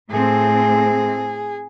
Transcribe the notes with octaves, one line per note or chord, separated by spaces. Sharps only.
A2 C4 G#4